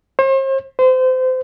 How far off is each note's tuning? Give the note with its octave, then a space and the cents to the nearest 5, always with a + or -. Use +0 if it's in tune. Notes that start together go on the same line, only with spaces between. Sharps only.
C5 +40
C5 -30